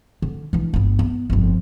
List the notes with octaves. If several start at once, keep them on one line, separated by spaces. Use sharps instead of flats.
D3
E3 D4
G1 B3
B3
G1 F2